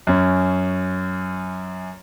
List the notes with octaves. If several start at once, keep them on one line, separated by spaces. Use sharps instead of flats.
F#2 C#4